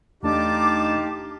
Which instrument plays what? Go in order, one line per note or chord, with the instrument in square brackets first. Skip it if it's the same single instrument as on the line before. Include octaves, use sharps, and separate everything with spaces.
[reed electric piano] E2 A3 D4 [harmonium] D#4 G4 [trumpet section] F4 A5 [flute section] D6